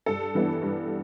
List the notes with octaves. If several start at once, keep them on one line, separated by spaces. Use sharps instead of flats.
G2 A4
E3 G3 B3 D4
G2